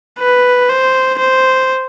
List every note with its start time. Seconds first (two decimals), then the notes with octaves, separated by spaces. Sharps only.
0.19 B4
0.69 C5
1.19 C5